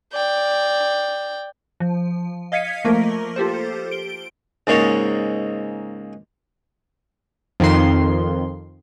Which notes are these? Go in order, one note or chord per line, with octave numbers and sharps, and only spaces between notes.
D5 G5
F3
D#5 F5 G#6 B6 C#7 D#7
F3 A3 A#3 A#4 A#6
F4 G4 A4 C5
D7 G7
C#2 G#2 A#3 C#5
F2 D#3 C6